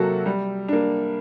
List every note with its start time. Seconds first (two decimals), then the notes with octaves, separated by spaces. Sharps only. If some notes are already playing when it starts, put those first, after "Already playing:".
Already playing: C3 F#3 A#3 F#4 A4
0.26 G3
0.68 A#3 D4